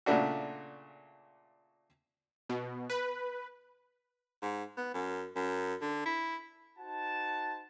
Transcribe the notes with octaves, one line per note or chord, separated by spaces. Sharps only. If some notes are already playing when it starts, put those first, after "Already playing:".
A#2 C#3 A3 D4 F#4
B2
B4
G#2
B3
F#2
F#2
D3
E4
D#4 F#4 C5 F#5 A5